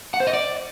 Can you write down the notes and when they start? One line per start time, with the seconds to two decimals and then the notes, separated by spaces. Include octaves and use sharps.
0.14 F#5
0.20 C5
0.27 D#5
0.33 D5